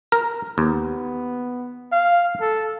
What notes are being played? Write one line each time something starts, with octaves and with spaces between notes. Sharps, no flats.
A#4
D#2 B3
F5
A4